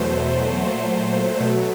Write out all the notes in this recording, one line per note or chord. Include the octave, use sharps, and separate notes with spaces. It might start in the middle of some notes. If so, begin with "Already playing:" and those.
Already playing: E2 B2 F#3 A3 C5
A#2 F#3 A3
B2 F#3 A3